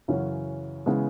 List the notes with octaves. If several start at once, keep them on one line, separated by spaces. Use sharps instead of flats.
F#2 C#3 E3 C#4 F#4
C#3 E3 G#3 B3